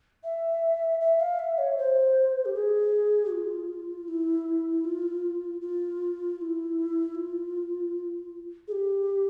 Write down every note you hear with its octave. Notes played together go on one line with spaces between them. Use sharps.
E5
E5
F5
E5
C#5
C5
G4
G#4
F4
E4
F4
F4
F4
E4
F4
G#4
G4